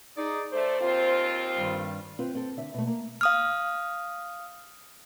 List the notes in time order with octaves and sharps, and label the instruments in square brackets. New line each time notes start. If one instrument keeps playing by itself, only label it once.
[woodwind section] D#4 G#4 D5
[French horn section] A3 D5 [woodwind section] C5
[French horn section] D#2 C4 F4
[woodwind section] G2 D#3 G3
[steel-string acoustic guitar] C4 F4 B4
C4 A4
D3 E5
B2 A3
A#3
[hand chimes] F5 D#6 F6